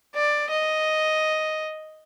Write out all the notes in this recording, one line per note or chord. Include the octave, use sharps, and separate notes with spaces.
D5
D#5